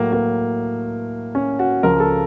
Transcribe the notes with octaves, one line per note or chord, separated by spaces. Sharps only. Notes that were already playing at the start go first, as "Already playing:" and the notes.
Already playing: A2 F#3 A#3
A#3
C#4
F#4
C#2 C#3 F3 A#4
A4